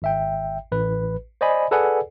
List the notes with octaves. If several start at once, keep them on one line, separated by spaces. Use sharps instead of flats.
G#1 E5 G5
A1 B4
C5 D5 D#5 G#5 B5
G#4 A4 B4 D5 F#5 G#5